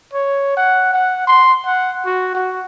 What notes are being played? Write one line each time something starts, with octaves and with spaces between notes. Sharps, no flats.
C#5
F#5
F#5
C6
F#5
F#4
F#4